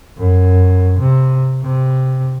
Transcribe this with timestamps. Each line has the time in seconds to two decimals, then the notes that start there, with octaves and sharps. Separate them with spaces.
0.17 F#2
0.99 C3
1.62 C3